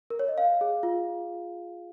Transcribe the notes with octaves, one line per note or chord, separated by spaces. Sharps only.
A#4
C#5
D#5
F5
G#4
F4